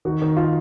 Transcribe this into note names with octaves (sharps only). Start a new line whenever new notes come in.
D#3 F#4
D#3
F4